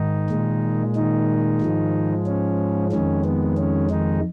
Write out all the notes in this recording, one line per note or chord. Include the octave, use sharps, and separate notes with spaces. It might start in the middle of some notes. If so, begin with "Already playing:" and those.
Already playing: G#2 D#3 D#4
A#2 G#3
D#3 D#4
G#2 F3 G#3
C#4
F2 D#3 G#3 C#4
B3
C#4
D#3 D#4